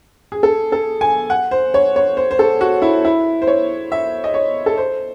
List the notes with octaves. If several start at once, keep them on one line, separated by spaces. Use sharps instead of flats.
G#4
A4
A4
G#5
F#5
C5
C#5
C#5
C5
C5
A4
F#4
E4
E4
C5
C#5
E5
D#5
C#5
A4
C5